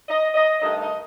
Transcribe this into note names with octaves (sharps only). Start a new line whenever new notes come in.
D#5
D#5
G2 D#3 A3 D4 D#5
D#5